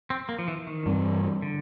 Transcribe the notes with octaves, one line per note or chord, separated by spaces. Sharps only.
C4
A#3
F3
E3
D#3
G2 E3 G3 C4
D3